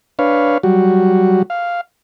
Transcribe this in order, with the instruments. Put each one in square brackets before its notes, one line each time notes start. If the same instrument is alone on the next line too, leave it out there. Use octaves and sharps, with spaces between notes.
[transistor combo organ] D4 B4 C#5 F5
F#3 G3 F#4
F5